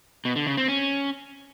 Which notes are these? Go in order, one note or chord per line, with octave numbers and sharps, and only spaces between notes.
B2
D3
C#3
C4
C#4